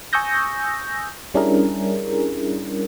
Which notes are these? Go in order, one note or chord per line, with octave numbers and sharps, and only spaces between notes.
G#5 C#6 D#6 E6 G6 A#6
G3 C#4 D4 E4 G#4 A#4